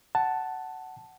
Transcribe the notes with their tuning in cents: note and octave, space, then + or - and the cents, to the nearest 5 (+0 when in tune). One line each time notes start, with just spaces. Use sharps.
F#5 +15 A5 +0